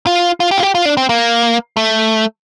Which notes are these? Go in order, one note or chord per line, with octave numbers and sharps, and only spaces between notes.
F4
F4
G4
F4
G4
F4
D4
C4
A#3
A3